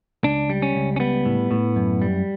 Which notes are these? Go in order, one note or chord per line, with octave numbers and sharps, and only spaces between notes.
C#2 D4
G3
C#4
C#2
C#4
G3 B3
A2
A2
F#2
G3